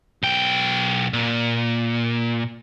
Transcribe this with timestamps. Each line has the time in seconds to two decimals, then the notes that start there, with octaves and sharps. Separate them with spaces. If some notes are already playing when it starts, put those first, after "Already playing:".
0.23 B1 G5
1.13 A#2